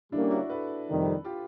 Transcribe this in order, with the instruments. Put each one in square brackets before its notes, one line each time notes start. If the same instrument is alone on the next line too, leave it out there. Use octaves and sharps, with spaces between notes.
[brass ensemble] D3 G3 A#3 C#4 [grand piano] D4 E4
[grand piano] E4 F#4
A4 B4
[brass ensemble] F2 C3 D#3 G3
[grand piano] F4 G4